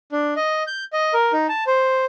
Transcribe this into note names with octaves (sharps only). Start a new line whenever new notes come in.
D4
D#5
G6
D#5
A#4
D#4
A5
C5